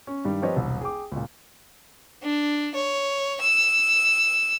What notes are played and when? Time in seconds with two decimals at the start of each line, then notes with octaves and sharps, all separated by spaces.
0.07 C#4
0.25 G2 D#3 G3
0.42 F3 C4 G4 B4 C#5 D#5
0.56 E1 C2
0.81 G#4 G5 D6
1.12 C#2 A#2
2.23 D4
2.75 C#5
3.42 E6